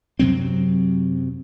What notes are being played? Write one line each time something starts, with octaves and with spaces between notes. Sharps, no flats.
F#2 C3 F#3 C4